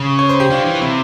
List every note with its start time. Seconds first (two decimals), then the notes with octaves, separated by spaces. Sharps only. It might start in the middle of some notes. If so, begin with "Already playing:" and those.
Already playing: C#3
0.19 C#5
0.29 C5
0.40 G4
0.50 D3 F4
0.65 E3
0.81 C3 E4